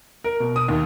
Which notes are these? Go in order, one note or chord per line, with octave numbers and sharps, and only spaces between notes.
A#4
B2
D#6
D#2